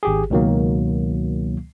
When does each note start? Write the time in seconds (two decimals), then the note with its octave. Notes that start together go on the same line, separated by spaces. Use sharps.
0.03 G#1 G4 G#4
0.30 C#2 B2 D#3 F#3 A#3